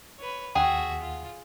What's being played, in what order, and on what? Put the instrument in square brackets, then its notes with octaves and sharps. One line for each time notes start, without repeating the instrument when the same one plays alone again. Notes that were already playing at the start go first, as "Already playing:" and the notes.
[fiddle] B4 C#5
[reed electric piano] D#2 F#5 [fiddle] F#4 E5 [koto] G#4 [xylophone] G5
[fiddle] F4